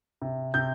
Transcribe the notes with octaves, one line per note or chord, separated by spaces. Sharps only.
C3
C3 G6